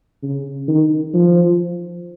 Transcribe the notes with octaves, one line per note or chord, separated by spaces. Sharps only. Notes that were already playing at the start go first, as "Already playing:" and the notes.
C#3
D#3
F3